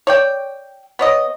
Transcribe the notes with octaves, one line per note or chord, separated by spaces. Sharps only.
C#5 D5 G5
B3 C#5 D#5